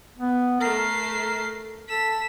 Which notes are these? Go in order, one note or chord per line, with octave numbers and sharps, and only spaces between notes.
B3
A3 A#4 C7
A4 B6 E7